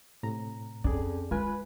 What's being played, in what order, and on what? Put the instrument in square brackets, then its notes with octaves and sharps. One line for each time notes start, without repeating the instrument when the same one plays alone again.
[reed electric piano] A2 C3 A#5
[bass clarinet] F2 [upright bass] C#4 [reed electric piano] G#4 D5
[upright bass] G#3 [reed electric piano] F4 G#5 [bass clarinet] B4